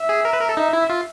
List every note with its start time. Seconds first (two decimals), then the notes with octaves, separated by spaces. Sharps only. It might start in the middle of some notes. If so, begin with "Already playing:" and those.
Already playing: E5
0.09 G#4
0.25 A#4
0.33 B4
0.41 A#4
0.49 A4
0.57 D#4 E5
0.73 E4
0.90 F4